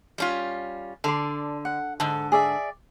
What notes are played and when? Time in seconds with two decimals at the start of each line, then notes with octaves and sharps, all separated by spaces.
0.18 G3 C#4 F4
1.04 D3 A4 D5 C6
1.65 F#5
2.00 G#2 D3 A4
2.32 G#4 D5 E5